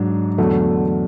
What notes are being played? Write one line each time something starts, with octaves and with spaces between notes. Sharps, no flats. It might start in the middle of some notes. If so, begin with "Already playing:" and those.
Already playing: G#2 F#3 D4
E2 D3 F#3 A3